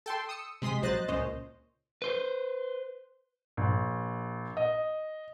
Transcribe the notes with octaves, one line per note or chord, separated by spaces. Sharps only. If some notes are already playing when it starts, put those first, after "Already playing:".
A4 G5 A5 C6
D#6 E6 C#7
C3 G#3 C6 D#6 B6
A#1 F#3 C5 D#5 F#6 A6
C#2 A#2 C#4 C5 D#5
B4 C5
A#1
D#5